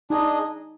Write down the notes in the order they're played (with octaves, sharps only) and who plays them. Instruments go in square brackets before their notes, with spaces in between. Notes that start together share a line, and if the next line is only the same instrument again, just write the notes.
[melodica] D4 G#4 D#5 [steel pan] D#4